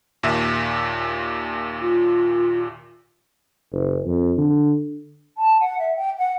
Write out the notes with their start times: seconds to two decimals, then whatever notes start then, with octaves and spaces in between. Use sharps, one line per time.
0.23 D#2 A#2 E5
1.81 F4
3.72 F#1
4.05 F2
4.38 D3
5.37 A5
5.60 F#5
5.78 E5
5.96 G5
6.18 F#5